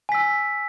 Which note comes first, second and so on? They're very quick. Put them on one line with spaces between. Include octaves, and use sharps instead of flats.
G#5 B6 E6